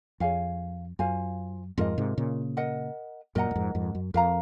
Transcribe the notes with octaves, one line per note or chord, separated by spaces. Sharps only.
F2 G#4 C#5 F5 G#5
F#2 F4 C5 F5 G#5
F2 G#2 F4 A#4 D#5
G#2 C3
A#2 C#3
A#4 D#5 F#5
F#2 A#2 A#4 D#5 F#5 A#5
F#2
F2 G#2
F2 G#2
F#2
F2 A#4 F5 A#5